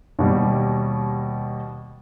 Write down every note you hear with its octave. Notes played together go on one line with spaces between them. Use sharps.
D#2 B2 G3